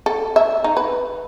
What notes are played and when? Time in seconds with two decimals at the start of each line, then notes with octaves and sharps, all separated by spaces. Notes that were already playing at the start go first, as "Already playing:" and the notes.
0.06 A4
0.36 E5
0.64 D#4
0.77 B4